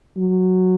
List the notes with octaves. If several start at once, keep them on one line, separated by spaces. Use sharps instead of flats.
F#3